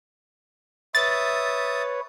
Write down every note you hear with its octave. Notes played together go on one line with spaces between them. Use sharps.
B4 C#5 E5 D#6 A6